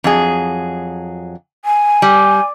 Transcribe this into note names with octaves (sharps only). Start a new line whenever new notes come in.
F2 F#3 G#4
G#5
G3